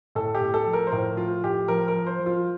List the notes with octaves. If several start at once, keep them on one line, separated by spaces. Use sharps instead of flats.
A2 A4
G4
A2
A4
F3
A#4
C5
A2 A#4
F3 F4
A2 G4
F3 A#4
A#4
F3
C5
F3
F4